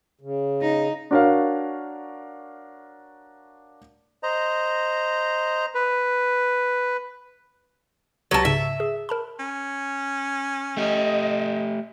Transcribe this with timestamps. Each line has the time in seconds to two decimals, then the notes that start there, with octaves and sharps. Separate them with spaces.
0.21 C#3
0.61 D#4
1.11 D4 F#4 A#4 C#5 D5 F5
4.23 C5 D#5 A#5
5.75 B4
8.31 C#2 F#3 G4 B4 A5
8.45 G#2 C#3 E5
8.80 G#4
9.09 A#4 A5 B5
9.39 C#4
10.77 A3 G4 D#5